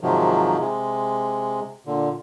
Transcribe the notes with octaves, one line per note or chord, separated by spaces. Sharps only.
G#2 C3 D#3 F3 F#3
C3 G#3
A#2 D3